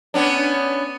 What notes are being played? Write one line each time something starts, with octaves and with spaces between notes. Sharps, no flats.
B3 C#4 D4